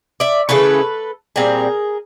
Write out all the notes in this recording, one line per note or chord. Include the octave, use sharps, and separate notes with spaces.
D5 E5
C#3 E3 A3 C#4 A4 B4
A#2 G3 C4 G#4 A#4